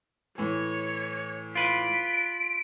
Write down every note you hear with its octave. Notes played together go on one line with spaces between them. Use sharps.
A2 E3 C#5
F4 B4 B6 D7